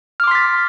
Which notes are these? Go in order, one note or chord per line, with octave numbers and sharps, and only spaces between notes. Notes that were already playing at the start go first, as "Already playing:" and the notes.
C6 D6 F6 A6 B6